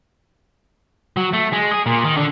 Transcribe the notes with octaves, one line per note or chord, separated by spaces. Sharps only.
F#3
A3
G#3
G#4
A#2
D#3
D3